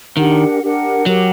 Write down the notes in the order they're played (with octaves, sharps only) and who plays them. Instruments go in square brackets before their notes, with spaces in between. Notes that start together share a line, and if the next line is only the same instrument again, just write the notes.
[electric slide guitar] D#3 [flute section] D4 G4 A#4 F#5
[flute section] D4 G4 A#4 F#5
[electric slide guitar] F#3 [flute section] G4 A#4 F#5